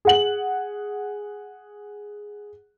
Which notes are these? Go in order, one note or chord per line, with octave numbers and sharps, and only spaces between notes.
G#4 F#5 F#7